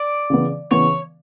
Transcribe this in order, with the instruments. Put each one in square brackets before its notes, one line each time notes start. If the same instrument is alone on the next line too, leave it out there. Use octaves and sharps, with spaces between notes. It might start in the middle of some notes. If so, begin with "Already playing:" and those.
Already playing: [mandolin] D5
[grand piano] C#3 E3 B3
[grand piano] C#3 E3 B3 [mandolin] C#5